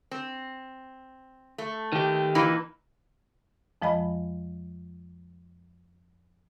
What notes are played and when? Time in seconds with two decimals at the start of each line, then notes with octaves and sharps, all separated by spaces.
0.11 C4
1.58 A3
1.92 D#3 G4
2.35 A#2 E3 D#4
3.82 F2 F3 G#3 D#5 B5